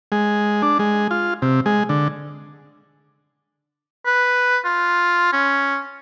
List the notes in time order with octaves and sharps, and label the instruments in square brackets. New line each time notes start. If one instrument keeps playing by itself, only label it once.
[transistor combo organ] G#3
D4
G#3
F4
C3
G#3
D3
[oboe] B4
F4
C#4